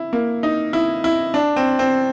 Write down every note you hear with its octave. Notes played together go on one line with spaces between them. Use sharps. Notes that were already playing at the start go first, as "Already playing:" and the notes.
Already playing: E4
A#3
D#4
E4
E4
D4
C4
C4